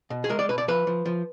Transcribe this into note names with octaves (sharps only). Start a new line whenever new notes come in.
B2
G#4
G#3 A#4
D5
B2 B4
D5
F3 B4
F3
F3